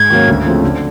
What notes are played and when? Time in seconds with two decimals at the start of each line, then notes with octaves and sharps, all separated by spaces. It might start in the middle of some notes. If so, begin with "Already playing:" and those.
Already playing: G#2 G#6
0.10 D#3 F#3 A#3 C#4
0.28 D2
0.46 C#3 F3 A3 C4
0.64 D3